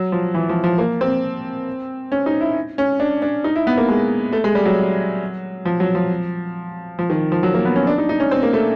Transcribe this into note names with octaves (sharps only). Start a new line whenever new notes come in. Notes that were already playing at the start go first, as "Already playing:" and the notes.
Already playing: F#3
F3
E3
F3
F3
A#3
C4
C#4
D#4
E4
C#4
D4
D4
D#4
E4
B3
A#3
G#3
A3
G#3
G3
F#3
F3
F#3
F3
F3
D#3
F3
F#3
A#3
B3
C#4
D4
D#4
D#4
C#4
C4
A#3
A3